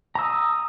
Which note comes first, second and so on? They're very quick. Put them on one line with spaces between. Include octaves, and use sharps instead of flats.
A#5 E6 D#6